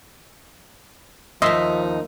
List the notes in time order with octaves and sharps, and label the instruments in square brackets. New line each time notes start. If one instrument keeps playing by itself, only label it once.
[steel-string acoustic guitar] D#2 D#4 [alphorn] F3 [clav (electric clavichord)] D#5 [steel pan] E5 C6